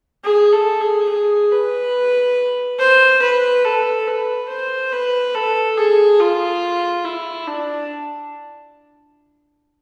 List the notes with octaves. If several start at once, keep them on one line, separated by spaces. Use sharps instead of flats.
G#4
A4
G#4
G#4
B4
C5
B4
A4
B4
C5
B4
A4
G#4
F4
E4
D4